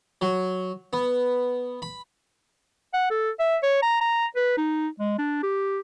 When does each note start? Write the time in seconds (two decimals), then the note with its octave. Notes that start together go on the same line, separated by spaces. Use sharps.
0.21 F#3
0.93 B3
1.82 B5
2.94 F#5
3.10 A4
3.40 E5
3.63 C#5
3.82 A#5
4.01 A#5
4.36 B4
4.57 D#4
5.00 G#3
5.18 D4
5.43 G4